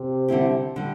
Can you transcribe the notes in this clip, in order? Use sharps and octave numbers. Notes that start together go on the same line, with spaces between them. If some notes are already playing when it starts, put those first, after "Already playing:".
Already playing: C3
D3 G3 C4 E4 G4
D3 G3